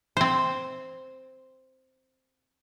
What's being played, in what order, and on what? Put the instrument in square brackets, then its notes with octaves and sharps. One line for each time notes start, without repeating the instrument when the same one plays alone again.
[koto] C4 C5